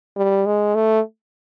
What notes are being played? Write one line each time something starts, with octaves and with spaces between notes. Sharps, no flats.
G3
G#3
A3